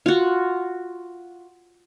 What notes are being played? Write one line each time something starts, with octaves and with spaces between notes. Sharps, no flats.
F4 F#4